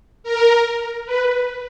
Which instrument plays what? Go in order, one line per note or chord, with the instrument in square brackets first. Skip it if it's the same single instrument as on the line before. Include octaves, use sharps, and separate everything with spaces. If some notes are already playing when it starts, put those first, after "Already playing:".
[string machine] A#4
B4